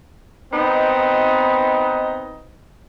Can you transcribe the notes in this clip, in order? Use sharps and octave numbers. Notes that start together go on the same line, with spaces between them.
B3 C4 D#4